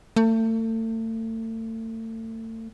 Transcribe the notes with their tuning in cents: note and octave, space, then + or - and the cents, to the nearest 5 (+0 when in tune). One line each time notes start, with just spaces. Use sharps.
A3 +35